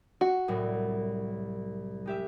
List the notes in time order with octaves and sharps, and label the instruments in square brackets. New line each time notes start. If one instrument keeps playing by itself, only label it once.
[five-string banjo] F#4
[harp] C2 A2 F#3
G#3 G4 E5